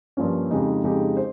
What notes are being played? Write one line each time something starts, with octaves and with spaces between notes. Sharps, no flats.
G2 F3 A#3 C#4
F2 C#3 G#3 D#4 G4
F2 C#3 G#3 D#4 G4
C5